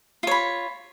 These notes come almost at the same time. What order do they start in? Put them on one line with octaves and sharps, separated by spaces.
F4 C#5 B5